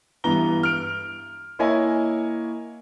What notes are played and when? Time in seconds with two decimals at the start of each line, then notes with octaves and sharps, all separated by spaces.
0.24 G2 E3 B3 A#5 G7
0.63 F6 D7
1.59 A#3 E4 C#5 D#5 G#5